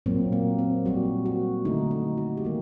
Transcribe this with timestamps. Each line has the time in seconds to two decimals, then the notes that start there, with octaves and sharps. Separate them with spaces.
0.06 A#2 F#3 A#3 C4
0.32 A#3
0.59 C4
0.86 A#2 G3 A#3 F#4
1.26 F#4
1.65 D3 A3 D#4
1.91 D#4
2.18 F#4
2.37 G4
2.45 D#3 G3 A#3 F#4